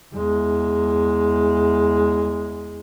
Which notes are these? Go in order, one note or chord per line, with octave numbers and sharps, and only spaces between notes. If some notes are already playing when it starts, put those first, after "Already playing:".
E2 G#3